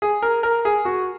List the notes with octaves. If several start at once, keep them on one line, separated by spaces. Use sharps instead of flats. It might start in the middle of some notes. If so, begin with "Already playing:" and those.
G#4
A#4
A#4
G#4
F#4